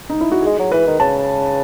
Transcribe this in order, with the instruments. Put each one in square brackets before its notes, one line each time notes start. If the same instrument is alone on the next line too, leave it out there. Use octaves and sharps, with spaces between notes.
[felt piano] D#4
E4
F#4
[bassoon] G#3 [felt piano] G#4
[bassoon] F#3
[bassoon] E3 [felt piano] B4
[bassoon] D#3
[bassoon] C#3 [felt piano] A5